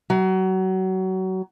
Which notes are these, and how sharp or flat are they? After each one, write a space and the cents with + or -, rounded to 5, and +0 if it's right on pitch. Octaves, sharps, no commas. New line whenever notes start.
F#3 +25